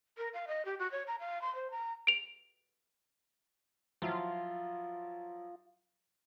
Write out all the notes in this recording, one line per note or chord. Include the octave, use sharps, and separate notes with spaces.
A#4
F5
D#5
G4
F#4
C#5
A#5
F5
C6
C5
A#5
D7 F7
F3 F#3 E4 F4